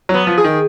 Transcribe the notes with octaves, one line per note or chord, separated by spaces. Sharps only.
F#3 B3
F3
G#4
D#3